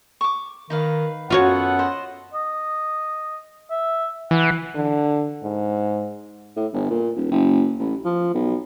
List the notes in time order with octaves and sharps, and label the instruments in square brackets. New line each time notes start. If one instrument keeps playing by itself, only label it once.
[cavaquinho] C#6 D6
[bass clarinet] D#3 [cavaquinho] D#4 B4 F5
[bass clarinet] F#2 [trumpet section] B3 A4 F#5 [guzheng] F4 F#4 C#5
[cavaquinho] C5 D#5
[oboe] D#5
E5
[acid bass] E3 [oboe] F#5
[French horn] D3
G#2
[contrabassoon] A2
G1
A#2
D#1
F#1
A1
F3
B1